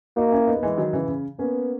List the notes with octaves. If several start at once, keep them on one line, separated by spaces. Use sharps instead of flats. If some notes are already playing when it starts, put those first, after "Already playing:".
A#3 D#4 F#4
C#4 E4
B3 D#4
A#3
E3 G#3
D#3 F#3
C#3 E3
C#3
A#3 B3 C#4